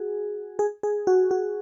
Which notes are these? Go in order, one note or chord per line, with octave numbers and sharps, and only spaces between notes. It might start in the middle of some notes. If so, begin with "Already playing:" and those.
Already playing: F#4 G#4
G#4
G#4
F#4
F#4